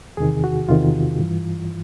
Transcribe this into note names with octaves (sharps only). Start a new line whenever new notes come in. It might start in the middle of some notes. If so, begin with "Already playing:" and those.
E2 C3 D#3 G#4
F#4
E2 C3 D#3 F4
G2 E3